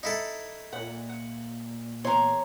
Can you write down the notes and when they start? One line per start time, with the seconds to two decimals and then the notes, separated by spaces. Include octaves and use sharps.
0.03 D#4 E4 A4
0.73 A#2 F#5
1.09 F#5
2.05 E2 C#5 A#5 C6